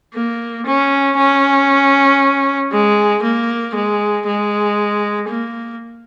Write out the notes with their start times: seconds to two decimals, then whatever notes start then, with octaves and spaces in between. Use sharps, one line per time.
0.14 A#3
0.66 C#4
1.17 C#4
2.72 G#3
3.23 A#3
3.74 G#3
4.27 G#3
5.28 A#3